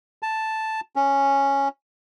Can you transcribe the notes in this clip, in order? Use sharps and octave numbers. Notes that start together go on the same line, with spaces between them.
A5
C#4